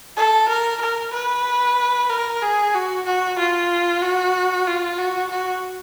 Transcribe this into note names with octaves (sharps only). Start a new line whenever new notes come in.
A4
A#4
A#4
B4
A#4
G#4
F#4
F#4
F4
F#4
F4
F#4
F#4